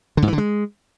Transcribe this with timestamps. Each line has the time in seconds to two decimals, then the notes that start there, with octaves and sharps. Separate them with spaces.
0.17 D3
0.22 G#2
0.28 E3
0.33 D3
0.38 G#3